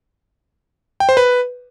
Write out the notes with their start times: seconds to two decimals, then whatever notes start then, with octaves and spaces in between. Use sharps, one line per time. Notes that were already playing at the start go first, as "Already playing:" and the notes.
1.00 G5
1.09 C5
1.17 B4